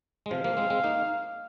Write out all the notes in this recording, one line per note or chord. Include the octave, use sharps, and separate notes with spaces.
G#3
C3 F3 F5
F3 A#3
G#3 C4
G#3 C4
A#3 D#4